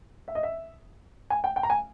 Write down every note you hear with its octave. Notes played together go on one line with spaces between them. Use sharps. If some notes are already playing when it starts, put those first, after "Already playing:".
E5
D#5
E5
G#5
G5
G5
A#5
G#5